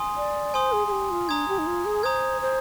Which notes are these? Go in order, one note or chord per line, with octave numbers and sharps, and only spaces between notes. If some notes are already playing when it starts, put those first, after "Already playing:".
Already playing: G#5 C6 D#6
D5
C5 G#5 C6 D#6
G#4
G#4
G4
F4
D4 A#5 D#6 G#6
G4
D#4
F4
G#4
C5 A#5 D#6 G#6
C5